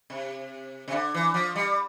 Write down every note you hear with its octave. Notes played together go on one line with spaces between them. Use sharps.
C3
C3
D3
E3
F3
G3